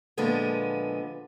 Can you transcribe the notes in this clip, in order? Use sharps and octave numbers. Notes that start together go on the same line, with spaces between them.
A#2 D3 F3 G#3 B3